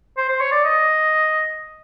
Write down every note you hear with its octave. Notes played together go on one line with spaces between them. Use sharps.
C5
C5
C#5
D5
D#5